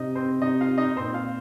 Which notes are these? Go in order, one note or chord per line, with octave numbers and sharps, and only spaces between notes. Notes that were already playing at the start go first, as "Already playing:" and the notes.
Already playing: C3 D#4 D#5
C4 C5
C3 D#4 D#5
F4 F5
D#4 D#5
A#2 C4 C5
F4 F5